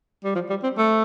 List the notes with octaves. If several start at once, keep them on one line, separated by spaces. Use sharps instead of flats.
G3
F3
G3
C4
A3